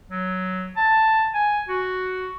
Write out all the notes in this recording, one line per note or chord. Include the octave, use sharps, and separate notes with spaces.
F#3
A5
G#5
F#4